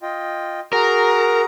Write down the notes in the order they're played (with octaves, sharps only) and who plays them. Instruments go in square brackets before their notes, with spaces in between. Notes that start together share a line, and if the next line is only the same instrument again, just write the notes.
[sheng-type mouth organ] F4 D#5 G5
[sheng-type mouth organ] F#4 G#4 A#5 [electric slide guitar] A#4